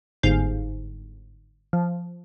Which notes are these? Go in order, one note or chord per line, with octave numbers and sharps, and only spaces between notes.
G1 G#2 F5 G6
F3